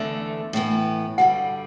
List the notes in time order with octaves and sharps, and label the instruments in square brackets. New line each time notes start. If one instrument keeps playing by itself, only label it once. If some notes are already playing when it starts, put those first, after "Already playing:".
Already playing: [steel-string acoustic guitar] E2 D3 A3 [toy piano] E5
[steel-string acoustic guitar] A2 E3 B3
[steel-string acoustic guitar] G2 D3 G3 [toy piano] F#5